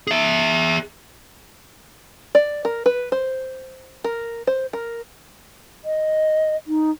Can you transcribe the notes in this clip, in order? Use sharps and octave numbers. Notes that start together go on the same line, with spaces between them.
G#4 E5
D5
A#4
B4
C5
A#4
C5
A#4
D#5
D#4